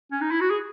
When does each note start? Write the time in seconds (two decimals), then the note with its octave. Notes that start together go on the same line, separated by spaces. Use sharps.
0.12 C#4
0.21 D#4
0.31 E4
0.40 F#4
0.50 G#4